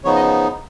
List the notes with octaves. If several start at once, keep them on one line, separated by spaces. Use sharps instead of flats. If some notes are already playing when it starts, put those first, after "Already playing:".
C#3 F3 B3 D#4 C#5
D#5